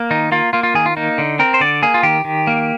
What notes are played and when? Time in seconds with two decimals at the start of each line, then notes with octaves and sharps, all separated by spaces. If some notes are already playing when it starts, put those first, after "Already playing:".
Already playing: A#3
0.11 D#3 D#4
0.32 A#3 F4
0.53 A#3 F4
0.63 F4
0.74 D#3 G#4
0.86 F4
0.97 A#3 D#4
1.18 D3
1.39 C4 A#4
1.54 C5
1.60 D3 D5
1.82 A#3 G#4
1.94 F4
2.03 D#3 G4
2.25 D#3
2.47 A#3